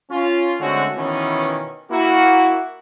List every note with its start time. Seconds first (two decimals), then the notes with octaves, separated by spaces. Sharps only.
0.11 C#4 F4
0.60 D3 G#3 A3 C4 C#4 F#4
0.97 B2 D#3 E3 B3 C#4
1.91 A#3 E4 F#4